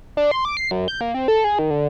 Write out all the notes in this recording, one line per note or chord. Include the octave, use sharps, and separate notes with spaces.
D4
C6
D6
C7
F#2
G6
A#3
C4
A4
G#4
D#3
D3